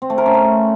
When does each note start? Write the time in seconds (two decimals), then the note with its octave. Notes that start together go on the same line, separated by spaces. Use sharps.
0.02 C4
0.10 A3
0.18 A#4
0.26 C#4
0.34 A3